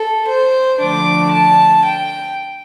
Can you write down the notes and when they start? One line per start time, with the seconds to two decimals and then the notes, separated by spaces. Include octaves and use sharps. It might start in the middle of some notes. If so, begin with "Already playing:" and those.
Already playing: A4
0.28 C5
0.80 D3 F3 A3 D4 D6
1.32 A5
1.84 G5